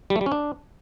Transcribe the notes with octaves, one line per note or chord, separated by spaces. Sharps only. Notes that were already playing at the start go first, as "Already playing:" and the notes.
G3
A3
G3
C#4
D4